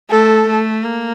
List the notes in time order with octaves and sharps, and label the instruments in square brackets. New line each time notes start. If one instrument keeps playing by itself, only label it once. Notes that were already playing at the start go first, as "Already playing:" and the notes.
[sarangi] A3 [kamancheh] A4
[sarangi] A3
A#3